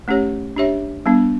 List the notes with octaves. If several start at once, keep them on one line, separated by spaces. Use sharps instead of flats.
A3 C#4 G4 C#5
D4 G4 C#5 E5
G3 B3 D4